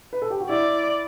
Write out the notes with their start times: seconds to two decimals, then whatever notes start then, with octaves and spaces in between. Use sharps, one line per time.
0.13 B4
0.22 A4
0.30 G4
0.41 F#4
0.49 E4 D5